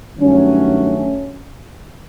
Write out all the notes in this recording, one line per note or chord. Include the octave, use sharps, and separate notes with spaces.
G2 D#3 F#3 A3 C#4